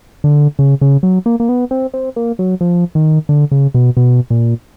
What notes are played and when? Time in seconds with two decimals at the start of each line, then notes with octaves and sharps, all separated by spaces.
0.24 D3
0.59 C#3
0.81 C#3
1.03 F#3
1.26 A#3
1.40 A#3
1.49 B3
1.71 C4
1.94 C4
2.16 A#3
2.39 F#3
2.61 F3
2.95 D#3
3.29 D3
3.52 C#3
3.74 B2
3.97 B2
4.30 A#2